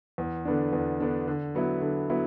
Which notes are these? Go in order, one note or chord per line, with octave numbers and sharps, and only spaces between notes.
E2
D3 B3 D4
E2
D3 B3 D4
D3
F#3 B3 E4
D3
F#3 B3 E4